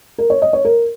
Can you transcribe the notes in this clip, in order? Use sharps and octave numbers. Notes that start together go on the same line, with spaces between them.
A#4
C#5
D#5
C#5
A#4